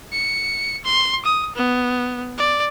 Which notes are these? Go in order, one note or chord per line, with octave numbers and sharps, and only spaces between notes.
C#7
C6
D#6
B3
D5